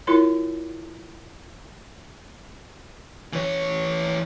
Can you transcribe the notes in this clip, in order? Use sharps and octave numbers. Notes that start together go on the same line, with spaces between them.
E4 F4 A#4 C#5 C6
E3 C#5